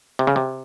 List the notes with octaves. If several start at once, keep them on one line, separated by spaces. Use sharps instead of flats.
C3
C#3
C3